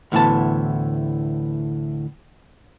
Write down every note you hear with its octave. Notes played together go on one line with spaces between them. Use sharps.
D2 A2 E3 B3 A5